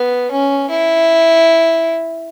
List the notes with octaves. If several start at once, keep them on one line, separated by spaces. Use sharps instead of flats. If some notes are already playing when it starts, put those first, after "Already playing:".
Already playing: B3
C#4
E4